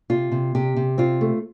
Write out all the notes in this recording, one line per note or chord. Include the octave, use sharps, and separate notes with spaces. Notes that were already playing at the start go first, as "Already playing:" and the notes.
C3 F4
C3
C3 G4
C3
C4 F4
A3